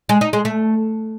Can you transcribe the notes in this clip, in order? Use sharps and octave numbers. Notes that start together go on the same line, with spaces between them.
G#3
D#4
G#3
A3